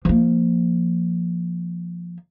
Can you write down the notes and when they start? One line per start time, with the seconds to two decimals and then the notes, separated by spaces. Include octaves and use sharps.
0.05 F3 A#3